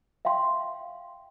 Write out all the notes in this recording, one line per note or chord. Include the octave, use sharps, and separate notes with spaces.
E5 F5 G5 C6